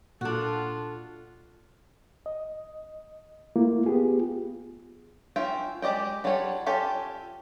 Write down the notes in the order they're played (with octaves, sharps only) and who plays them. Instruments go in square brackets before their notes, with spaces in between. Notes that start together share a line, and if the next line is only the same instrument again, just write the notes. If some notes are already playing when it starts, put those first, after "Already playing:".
[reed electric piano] A#2 [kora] D4 F#4 [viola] F4 A4
[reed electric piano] D#5
A3 A#3 E4 F4
B3 F4 G4 G#4
[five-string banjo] C#4 F4 E5 G5
G#3 G4 D5 D#5 G5
F#3 G3 F4 A4 C#5
C#4 F4 G4 A4 C#5